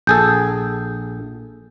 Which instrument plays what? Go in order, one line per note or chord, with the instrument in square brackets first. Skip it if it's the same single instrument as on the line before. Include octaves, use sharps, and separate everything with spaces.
[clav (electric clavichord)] A#1 G#4 A4 [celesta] G6